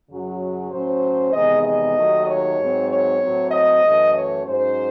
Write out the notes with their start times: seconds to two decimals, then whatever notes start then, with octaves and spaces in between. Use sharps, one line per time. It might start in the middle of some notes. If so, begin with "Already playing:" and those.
0.09 F#2 C#3 F#3 C#4
0.71 A2 F#3 C#4 C5
1.33 E2 C3 D#3 G#3 D#5
1.64 D#5
1.96 D#2 D#3 F#3 A3
2.26 C#5
2.57 G#2 F#3 C4
2.88 C#5
3.20 A2 F#3 C4
3.51 D#5
3.82 F#2 E3 A3
4.14 C#5
4.44 G#2 F#3 C#4 C5